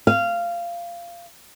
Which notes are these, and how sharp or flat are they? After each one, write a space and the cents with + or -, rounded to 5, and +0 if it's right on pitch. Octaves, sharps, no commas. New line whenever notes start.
F5 -15